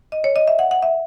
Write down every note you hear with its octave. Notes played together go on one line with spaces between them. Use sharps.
D#5
C#5
D#5
E5
F#5
F#5
E5